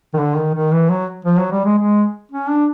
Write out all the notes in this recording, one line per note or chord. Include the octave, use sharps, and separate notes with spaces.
D#3
D3
D#3
D#3
E3
F#3
F3
F#3
G3
G#3
G#3
C#4
D4